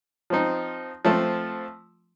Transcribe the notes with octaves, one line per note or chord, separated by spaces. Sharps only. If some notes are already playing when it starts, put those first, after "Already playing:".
F3 C4 D#4
F3 A3 C4